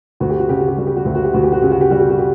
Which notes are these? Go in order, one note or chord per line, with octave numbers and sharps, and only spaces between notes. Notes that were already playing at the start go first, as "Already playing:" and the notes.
D2 F#4
G4
F#4
C#3 G4
F#4
G4
G3 F#4
G4
F#4
D2 G4
F#4
G4
D2 F#4
G4
F#4
C#3 G4
F#4
G4
G3 F#4
G4
F#4
G4